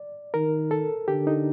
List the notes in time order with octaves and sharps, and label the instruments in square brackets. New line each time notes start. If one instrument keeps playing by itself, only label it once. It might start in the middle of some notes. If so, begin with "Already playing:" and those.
Already playing: [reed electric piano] D5
[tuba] D#3 [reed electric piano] A#4
[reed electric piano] A4
[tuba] D3 [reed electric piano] G4
[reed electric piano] D#4